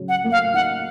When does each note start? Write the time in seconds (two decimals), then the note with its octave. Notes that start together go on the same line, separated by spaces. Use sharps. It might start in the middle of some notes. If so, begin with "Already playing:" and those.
Already playing: C#3 F#3
0.09 F#5
0.24 A#3
0.32 F5
0.54 D#4 F#5